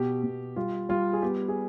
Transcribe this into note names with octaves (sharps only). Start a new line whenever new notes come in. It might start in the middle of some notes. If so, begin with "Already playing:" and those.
Already playing: B2 G4
B2
G3 F4
G3 F4
G#4
B3 G4
G#4